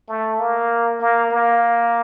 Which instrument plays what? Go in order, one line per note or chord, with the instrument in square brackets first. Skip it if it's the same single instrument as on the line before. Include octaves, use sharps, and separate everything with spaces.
[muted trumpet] A3
A#3
A#3
A#3